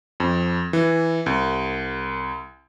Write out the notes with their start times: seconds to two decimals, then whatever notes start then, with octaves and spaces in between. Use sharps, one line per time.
0.20 F2
0.73 E3
1.26 C2